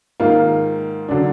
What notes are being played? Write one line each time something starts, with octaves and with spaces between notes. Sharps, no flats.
G#2 D#3 A#3 F4
D3 F#3 D4